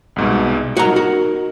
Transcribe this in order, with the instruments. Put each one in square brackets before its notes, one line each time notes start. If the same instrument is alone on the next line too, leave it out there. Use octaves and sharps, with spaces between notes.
[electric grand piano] C2 G#2 B2
[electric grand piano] D#4 A#4 [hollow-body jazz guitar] F#4 A#5
[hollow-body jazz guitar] F#4